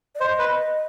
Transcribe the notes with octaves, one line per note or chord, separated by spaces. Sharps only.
D5
C5 D#5
B4